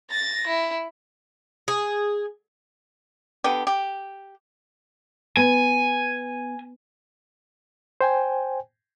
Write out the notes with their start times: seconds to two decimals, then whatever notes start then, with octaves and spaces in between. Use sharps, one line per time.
0.10 A6 A#6
0.47 E4
1.68 G#4
3.44 D3 B3 G4
3.67 G4
5.37 B3 G#5
8.01 C5 G5 G#5